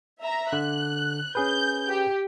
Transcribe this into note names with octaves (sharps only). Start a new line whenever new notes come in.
E5 A#5
D3 F#6
C#4 G#4 B4 G6
G4